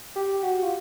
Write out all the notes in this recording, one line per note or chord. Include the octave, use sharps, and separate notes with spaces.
G4
F#4
F4